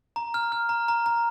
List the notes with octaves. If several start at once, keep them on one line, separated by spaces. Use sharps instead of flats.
A#5
F6
F6
A#5
A#5
A#5